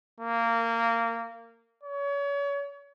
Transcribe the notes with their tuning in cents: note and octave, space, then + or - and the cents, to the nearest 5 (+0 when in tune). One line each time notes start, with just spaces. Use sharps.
A#3 -20
C#5 +35